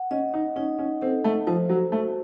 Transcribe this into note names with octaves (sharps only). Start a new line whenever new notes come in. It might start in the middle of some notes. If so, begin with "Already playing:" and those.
Already playing: F#5
C#4 D#5
D#4
C#4 D#4
C#4
C4 A4
A3
F3 C5
F#3
A3 F#4